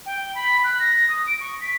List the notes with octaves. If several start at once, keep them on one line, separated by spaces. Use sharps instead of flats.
G5
B5
F#6
A#6
D#6
D7
C#6
B6